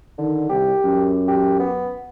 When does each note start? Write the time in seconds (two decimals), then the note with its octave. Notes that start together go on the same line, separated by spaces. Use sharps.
0.18 D3 D#3
0.49 C2 G4
0.84 F#2
1.28 G4
1.60 B3